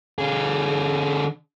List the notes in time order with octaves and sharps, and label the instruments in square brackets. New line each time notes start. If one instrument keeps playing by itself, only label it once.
[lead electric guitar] D3 G#4